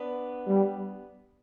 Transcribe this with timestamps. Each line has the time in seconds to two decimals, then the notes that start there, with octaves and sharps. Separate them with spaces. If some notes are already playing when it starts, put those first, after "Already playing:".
Already playing: B3 D4
0.47 G3